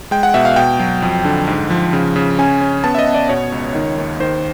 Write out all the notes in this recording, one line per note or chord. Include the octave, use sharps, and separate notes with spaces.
G#3 G5
F#5
B2 E5
F5
B2 G5
F#3
F2
D3
G#2
F3
C#3
C#3
C#4 G#5
C#4
B3 A5
E5
D#5
B3
D5
B2 C#5
C#2
D#3
D#2
D#3 C5